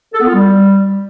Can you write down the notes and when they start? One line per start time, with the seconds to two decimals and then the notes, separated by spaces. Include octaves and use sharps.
0.13 A4
0.20 B3
0.27 F4
0.34 G3